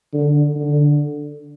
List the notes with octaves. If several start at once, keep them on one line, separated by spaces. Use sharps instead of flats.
D3
D3